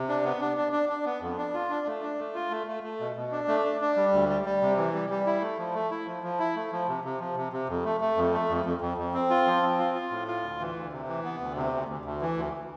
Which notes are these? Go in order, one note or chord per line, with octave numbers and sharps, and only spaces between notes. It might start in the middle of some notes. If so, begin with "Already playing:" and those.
Already playing: C3
D4
B3
D4
D4
D4
D4
B3
F2
D4
F4
D4
A3
D4
A3
F4
A3
A3
A3
B2
B2
D4
A3
D4
D4
G3
D2
G3
G3
C3
E3
G3
G3
E4
A3
F3
A3
E4
F3
F3
E4
A3
F3
C3
C3
F3
C3
C3
F2
A3
A3
F2
A3
F2
F2
F2
F2
C4
F4
F3
C4
F4
F4
A2
F4
D2
E3
D2
C3
E3
B3
D2
C3
D2
D2
D2
E3
D2